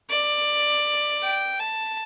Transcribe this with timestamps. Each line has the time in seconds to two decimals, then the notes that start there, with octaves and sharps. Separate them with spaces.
0.10 D5
1.22 G5
1.60 A5